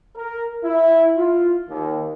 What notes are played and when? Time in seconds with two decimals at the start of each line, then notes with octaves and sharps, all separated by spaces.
0.16 A#4
0.64 E4
1.17 F4
1.69 D#2